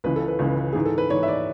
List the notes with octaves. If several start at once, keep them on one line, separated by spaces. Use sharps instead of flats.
C#2 C#3 E3 B4
A4
B4
C#2 C#3 E3
G#2 E3 G#4
A4
B4
G#2 E3 C#5
E5
D5